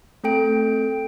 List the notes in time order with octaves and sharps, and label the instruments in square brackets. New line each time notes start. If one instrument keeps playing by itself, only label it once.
[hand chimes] A3 C4 A4 G5 D7